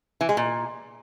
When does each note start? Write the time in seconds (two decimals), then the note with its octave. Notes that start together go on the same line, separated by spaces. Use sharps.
0.21 E3
0.29 G#3
0.37 A#2